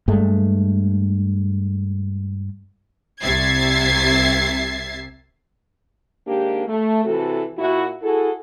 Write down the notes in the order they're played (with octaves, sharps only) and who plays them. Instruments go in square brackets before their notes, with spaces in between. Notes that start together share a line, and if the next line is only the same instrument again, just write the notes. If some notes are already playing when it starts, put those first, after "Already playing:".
[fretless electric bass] G2 G#3 A3
[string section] C2 C3 E5 G#6 A6 C7
[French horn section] D#2 G#2 A#3 D4 G4
A3
C3 E3 F#4 A4
A#2 E4 F#4
E4 F#4 G#4 A4